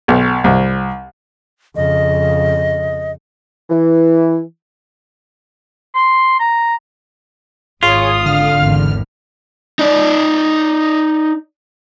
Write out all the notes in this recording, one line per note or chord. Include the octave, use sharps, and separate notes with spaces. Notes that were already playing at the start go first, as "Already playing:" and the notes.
B1
C2
F2 C#3 D#5
E3
C6
A#5
G#1 F4 G#4 C#5 D#6
D3 F5 F6
G#1 E2
D#4 D5